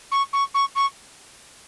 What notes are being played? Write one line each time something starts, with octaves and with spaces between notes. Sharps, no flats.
C#6
C#6
C#6
C#6